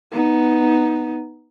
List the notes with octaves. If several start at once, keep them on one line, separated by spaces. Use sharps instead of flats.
B3 D#4